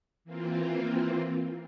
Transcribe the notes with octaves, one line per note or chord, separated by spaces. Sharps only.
E3 A#3 C4 F4